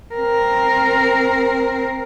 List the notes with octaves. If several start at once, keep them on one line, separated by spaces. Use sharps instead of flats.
C4 A#4